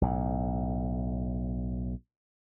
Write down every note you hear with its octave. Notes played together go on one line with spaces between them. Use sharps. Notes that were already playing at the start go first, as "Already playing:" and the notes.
B1 A2